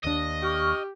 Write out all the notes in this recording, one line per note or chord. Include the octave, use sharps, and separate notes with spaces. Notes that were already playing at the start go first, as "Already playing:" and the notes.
D#2 D4 D#5
G4 C#6 F6